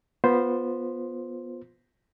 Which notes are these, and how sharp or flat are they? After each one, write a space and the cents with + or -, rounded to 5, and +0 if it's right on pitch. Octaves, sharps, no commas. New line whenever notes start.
B3 -10 F4 +15 C5 +0